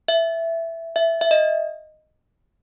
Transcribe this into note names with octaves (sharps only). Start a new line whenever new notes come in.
E5
E5
E5
D#5